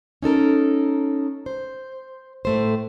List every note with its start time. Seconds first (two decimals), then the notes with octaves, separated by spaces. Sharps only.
0.22 C#4 D#4 A4 A#4
1.46 C5
2.45 A2 A3 C5